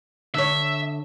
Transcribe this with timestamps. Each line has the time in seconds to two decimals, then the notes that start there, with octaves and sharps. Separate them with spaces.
0.34 D3 C#5 E5